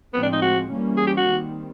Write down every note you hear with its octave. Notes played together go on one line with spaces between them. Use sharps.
A2 F3 G#3 B3 C4
D4
D#4
F#4
E3 G3 A#3 C#4
G#4
G4
F#4
D#3 G3 C4